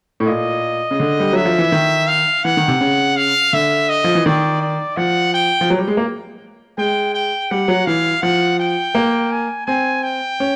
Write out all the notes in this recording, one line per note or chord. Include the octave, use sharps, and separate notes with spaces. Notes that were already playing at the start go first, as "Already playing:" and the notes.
A2
A#2 D#5
C#3
D3
G3
F#3 E5
F3
E3
D#3
F5
E3 F#5
D#3
C3
C#3
F5
D3 E5
D#5
F3
E3
D#3 D5
D5
F3 F#5
G5
F3
F#3
G3
G#3
A#3
G#3 G5
G5
G3 F#5
F#3
E3 F5
F3 F#5
G5
A#3
G#5
C4 G#5
G5
C#4